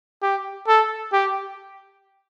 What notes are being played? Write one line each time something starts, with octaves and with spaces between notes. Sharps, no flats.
G4
A4
G4